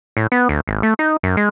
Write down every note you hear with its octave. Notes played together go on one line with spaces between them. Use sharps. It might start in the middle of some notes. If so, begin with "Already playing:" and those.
A2
B3
D2
G#1
A3
D#4
F#2
G#3